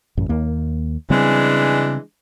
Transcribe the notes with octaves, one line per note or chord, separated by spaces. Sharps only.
A1 F#2
D#2 A#3
C#3 E3 G3 G#3 C4 D4